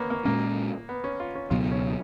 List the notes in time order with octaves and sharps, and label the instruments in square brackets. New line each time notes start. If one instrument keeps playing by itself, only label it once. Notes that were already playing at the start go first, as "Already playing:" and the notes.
Already playing: [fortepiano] A#3 B3 C#4
A#3
[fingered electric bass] A#2 G#3 C#4 [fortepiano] A#3
[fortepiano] B3
C#4
F4
C#4
[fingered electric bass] C#2 B2 F#3 B3 [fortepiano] F4
[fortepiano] C#4